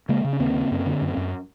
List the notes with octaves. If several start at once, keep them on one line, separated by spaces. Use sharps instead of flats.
C#3 G#3 A#3
C#3
C#4
D#2 A#3 C4
C#3
F#2
D3
F#2
F#2